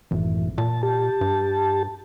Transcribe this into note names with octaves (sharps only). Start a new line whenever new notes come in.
G#1 F#2 A2 E3
A#2 A5
G4 A5
G2